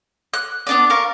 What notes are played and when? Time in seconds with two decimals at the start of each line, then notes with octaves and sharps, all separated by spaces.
0.34 F#6
0.67 B3 D4 D5
0.90 A#4 F5 C#6